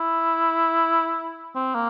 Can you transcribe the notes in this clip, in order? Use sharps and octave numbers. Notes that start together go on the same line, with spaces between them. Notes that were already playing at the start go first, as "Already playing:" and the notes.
Already playing: E4
C4
A#3